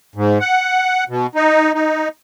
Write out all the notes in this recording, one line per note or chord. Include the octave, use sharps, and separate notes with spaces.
G#2
F#5
B2
D#4
D#4